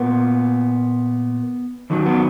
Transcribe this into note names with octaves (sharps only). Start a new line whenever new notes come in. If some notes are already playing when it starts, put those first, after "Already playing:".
Already playing: A#2 A#3 B3
D#2 D#3 F#3
B3